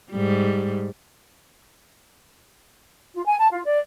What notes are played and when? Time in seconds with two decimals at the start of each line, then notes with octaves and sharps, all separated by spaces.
0.11 G#2 G3
3.15 F4
3.27 G#5
3.39 A5
3.53 F4
3.66 D5